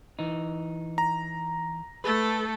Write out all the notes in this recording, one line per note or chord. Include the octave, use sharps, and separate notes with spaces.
E3 D#4
A#5
A3 A4 B4